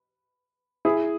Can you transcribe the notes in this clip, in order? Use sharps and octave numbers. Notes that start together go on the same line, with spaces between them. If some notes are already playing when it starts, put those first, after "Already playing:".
E4 G#4